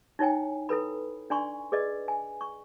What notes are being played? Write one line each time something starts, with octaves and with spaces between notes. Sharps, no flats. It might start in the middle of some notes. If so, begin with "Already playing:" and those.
D#4 E4 C#5 G5 G#5
E4 A4 B4 B5
D4 D5 G#5 C6 C#6
G#4 B4 D5 D#5
G#5
C#6